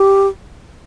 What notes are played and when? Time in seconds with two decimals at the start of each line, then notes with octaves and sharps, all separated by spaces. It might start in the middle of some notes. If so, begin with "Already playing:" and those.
Already playing: G4